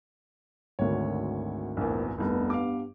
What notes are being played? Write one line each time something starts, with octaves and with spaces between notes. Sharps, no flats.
G#1 D2 A#4 C#5
A#1 E2 A#3 C4 A#4
F1 C2 G2 B3
F5 D6